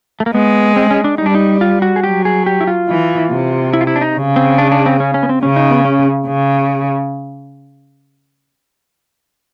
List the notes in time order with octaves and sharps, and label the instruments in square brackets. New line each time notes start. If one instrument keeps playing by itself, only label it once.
[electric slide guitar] A3
A#3
[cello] G#3 [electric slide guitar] B3
[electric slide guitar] C4
C#4
D4
[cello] G3 [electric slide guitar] D#4
[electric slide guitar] D4
D#4
F4
F#4
G#4
[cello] F#3 [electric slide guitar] G4
[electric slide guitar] G#4
G4
E4
F4
[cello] E3
C3
[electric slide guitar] E4
F4
E4
D4
D#4
[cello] C#3
[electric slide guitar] C4
D4
D4
C4
C#4
C#4
B3
C4
[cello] C#3 [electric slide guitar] C#4
[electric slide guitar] D#4
B3
C#4
[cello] C#3